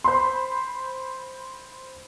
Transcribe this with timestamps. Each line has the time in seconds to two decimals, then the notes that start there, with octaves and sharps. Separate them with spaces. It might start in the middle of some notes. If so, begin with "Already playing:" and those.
0.04 C5 B5 C6